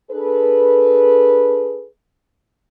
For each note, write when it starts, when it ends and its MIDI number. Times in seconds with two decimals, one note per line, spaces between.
0.11 1.86 62
0.11 1.86 68
0.11 1.86 69
0.11 1.86 71